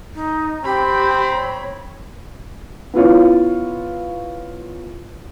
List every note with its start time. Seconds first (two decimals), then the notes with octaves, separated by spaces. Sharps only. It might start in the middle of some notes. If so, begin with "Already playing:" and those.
0.14 D#4
0.64 C4 G4 B5
1.34 C#5
2.94 B3 E4 F4 C#5